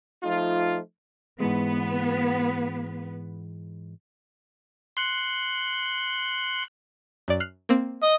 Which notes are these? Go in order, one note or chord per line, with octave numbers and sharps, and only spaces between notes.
F3 A3 D#4 F4
G#2 E3 G#3 B3 B4
C6 F#6 C#7
F#2 D5
F6 F#6 C7
A#3 C4
D#5